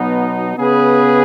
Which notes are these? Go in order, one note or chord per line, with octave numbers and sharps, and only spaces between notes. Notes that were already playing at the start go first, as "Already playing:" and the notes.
Already playing: B2 F#3 B3 D#4
C#3 B3 G#4 B4